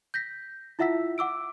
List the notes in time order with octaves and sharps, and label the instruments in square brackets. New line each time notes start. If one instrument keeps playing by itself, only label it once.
[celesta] G6 A#6 B6
E4 F4 E5 F#5 E6 B6
F#5 D6 E6 D7